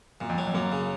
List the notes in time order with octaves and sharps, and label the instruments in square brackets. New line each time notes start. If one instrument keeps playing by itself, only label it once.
[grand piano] F#2 [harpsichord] A#2
[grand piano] F2
[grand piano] F#2 [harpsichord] F#3
[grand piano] F2
[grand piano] F#2 [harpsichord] A#3
[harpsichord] C#3